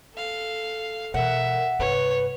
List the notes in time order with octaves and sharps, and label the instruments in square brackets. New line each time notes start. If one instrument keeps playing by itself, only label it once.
[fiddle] A4 F5
[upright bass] B2 E3 [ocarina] A#4 [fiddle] E5 [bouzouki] F#5
[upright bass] G2 C3 [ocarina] B4 [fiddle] C#5